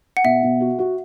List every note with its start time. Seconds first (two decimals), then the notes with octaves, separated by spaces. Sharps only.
0.17 F#5
0.24 B2 E5
0.43 B2
0.60 F#4
0.79 F#4